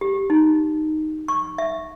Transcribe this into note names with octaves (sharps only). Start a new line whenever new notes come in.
G4
D#4
C#6
E5